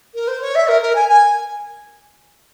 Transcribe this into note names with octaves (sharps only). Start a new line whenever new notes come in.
A#4
C5
C#5
E5
A#4
A#4
G#5
G#5